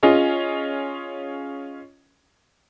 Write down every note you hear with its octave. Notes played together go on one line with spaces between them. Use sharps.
C#4 F4 G#4 D#5